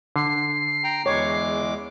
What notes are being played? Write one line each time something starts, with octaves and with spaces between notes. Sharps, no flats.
D3 C7
G5 A#5
E2 G#3 C#5 D6